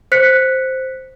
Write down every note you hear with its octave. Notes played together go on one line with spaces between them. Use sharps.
C5 F#6 B6 C#7